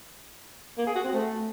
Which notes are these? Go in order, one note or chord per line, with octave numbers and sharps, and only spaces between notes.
A#3
G#4
F#4
C4
A3